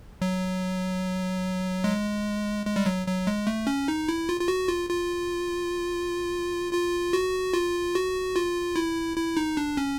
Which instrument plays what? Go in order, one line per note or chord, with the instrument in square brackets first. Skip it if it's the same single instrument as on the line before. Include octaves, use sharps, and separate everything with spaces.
[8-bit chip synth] F#3
G#3
G#3
G3
F#3
F#3
G#3
A3
C#4
D#4
E4
F4
F4
F#4
F4
F4
F4
F#4
F4
F#4
F4
E4
E4
D#4
D4
C#4